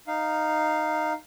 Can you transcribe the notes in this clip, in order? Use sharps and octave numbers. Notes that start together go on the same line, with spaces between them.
D#4 F5